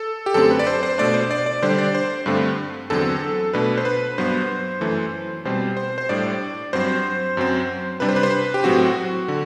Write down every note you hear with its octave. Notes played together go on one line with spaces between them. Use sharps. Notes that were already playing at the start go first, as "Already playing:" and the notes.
Already playing: A4
G4
F#2 D3 A3 C4 A4
B4
D5
C5
C5
B2 A3 D4 D5
C5
D5
D5
D3 G3 D4 C5
D5
C5
G2 D3 A3 C4
E2 D3 F#3 C4 A4
B2 A3 D4 B4
C5
B4
G2 F#3 B3 C5
F#2 E3 A3
B2 G3 C4 C5
C5
C5
A2 G3 D4 D5
G2 F#3 C4 C5
F#2 F#3 C4
C3 G3 D4 B4
C5
B4
C5
B4
G4
A2 F#3 C4 F#4
D3